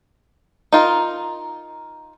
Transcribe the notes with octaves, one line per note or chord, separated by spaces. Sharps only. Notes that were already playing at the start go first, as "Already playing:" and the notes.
D#4 F4 A#4